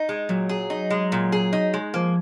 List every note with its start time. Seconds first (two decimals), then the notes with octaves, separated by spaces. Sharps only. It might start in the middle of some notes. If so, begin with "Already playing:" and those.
Already playing: D#4
0.09 G#3
0.29 A#2 F#3
0.49 G#4
0.70 D#4
0.90 G#3
1.12 A#2
1.32 G#4
1.53 D#4
1.74 G#3
1.94 F3 A#3